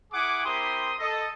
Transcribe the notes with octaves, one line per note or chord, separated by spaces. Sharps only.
E4 G#4 F#5 G#5 D6
C4 E4 G4 A#4 C6 D#6
A4 D#5